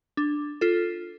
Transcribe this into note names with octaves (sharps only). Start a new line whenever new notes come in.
D4
F4 A4